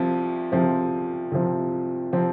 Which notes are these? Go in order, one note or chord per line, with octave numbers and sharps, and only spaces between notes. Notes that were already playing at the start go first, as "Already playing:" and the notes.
Already playing: C2 C3 F3 C4
C2 C3 F3 C4
C2 C3 F3 C4
C3 F3 C4